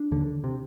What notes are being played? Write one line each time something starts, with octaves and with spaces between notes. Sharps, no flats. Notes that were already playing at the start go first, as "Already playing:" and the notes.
Already playing: D4
D#2 D3
C3